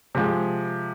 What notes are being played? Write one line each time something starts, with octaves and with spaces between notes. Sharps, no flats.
C3 F3 G#3